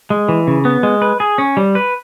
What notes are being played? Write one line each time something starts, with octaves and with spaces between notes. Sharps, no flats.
G#3
E3
C#3
B3
G#3
B4
G#4
C#4
G3
B4